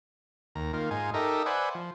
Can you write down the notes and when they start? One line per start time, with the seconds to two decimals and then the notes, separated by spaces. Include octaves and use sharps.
0.55 D#2 A#5
0.73 D#3 A#3 F4
0.91 G#2 D#4 F4 G#5
1.14 D#4 G4 A4 A#4 D#5 E5
1.46 B4 C5 D5 E5 F#5 G#5
1.75 F3